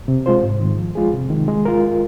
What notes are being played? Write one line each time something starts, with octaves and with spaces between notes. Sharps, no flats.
C3
G#3 F4 C5
G#2
D#3 G#3
F3
G#3 F4 G#4
C3
D#3 G#3
G#3
F4 A#4